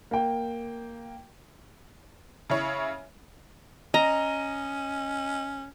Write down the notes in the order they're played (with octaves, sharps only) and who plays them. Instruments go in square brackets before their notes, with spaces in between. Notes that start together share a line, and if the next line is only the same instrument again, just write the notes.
[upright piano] A#3 G5
[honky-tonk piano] C#3 E4 C#5
[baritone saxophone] C#4 [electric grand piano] D#5 [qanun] A#5